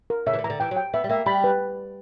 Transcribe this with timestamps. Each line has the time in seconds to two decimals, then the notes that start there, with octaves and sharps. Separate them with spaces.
0.10 A#4
0.26 C#3 E5
0.34 E3
0.39 D3
0.44 E3 A#5
0.50 D3
0.60 E3 G5
0.71 F#3
0.77 G5
0.94 B3 E5
1.04 G3
1.10 A#3 E5
1.26 G3 B5
1.44 B4